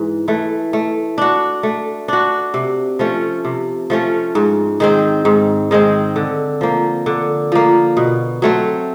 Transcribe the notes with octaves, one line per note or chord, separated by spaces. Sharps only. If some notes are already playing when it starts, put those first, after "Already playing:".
Already playing: G#2 E3
E3 A3
A3
D4 F#4
A3
D4 F#4
C3
F3 A3 C#4
C3
F3 A3 C#4
G#2
D#3 G#3 C4
G#2
D#3 G#3 C4
D3
F3 A#3
D3
F3 A#3
B2
F#3 A3 C4